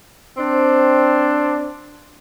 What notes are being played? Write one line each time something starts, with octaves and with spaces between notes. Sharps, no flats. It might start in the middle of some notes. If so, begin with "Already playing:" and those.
C4 D4